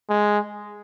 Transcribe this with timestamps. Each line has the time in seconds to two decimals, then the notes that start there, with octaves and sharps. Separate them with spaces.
0.10 G#3